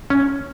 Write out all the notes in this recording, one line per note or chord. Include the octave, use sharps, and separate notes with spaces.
C#4